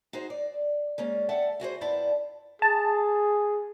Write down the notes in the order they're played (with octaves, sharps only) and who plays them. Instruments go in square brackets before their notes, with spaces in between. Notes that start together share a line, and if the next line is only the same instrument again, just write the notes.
[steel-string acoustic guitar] D#4 F#4 G#4 C5
D5
G#3 A#3 C#4 D5
A4 D5 E5 F#5 G5 A5
E4 F#4 G#4 C5
F#2 B3 C4 E4 D5 A5
[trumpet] G#4 [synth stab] A5